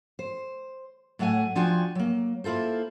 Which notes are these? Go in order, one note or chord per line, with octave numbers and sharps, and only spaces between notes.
C5
A2 F#3 A3 F#5 G#5
F3 D4 F4 F#4 G5 G#5
F#3 A#3
A#3 E4 F4 A4 C5